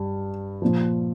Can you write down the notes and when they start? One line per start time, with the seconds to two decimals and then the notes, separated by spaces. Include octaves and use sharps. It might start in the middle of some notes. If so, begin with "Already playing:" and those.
Already playing: G2
0.62 A#2 F3